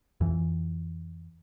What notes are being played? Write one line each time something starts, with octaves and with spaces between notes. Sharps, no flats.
F2 E3